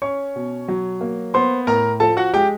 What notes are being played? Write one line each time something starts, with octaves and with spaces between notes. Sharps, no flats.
C#4 C#5 C#6
B2
F#3
A#3
B3 C5 C6
A2 A#4 A#5
F3 A4 A5
F#4 F#5
G#3 G4 G5